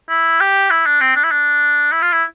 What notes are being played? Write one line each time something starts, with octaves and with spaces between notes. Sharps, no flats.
E4
G4
E4
D4
C4
D4
E4
D4
E4
F4
E4